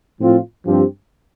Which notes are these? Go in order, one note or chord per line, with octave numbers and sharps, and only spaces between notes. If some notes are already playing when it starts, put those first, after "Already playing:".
A2 F3 C4 F4
G2 F3 C4 G4